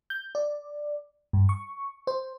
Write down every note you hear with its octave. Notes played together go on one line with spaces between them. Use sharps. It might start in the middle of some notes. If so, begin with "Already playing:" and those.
G6
D5
G2
C#6
C5